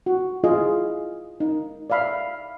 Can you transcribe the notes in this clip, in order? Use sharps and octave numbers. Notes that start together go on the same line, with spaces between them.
F#4
E4 F4 G#4 D#5
D#4
D5 E5 F5 B5